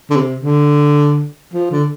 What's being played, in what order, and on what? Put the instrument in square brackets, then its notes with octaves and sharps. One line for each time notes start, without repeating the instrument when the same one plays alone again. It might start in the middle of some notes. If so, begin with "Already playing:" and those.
[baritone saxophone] D3
C3
D3
F3
D3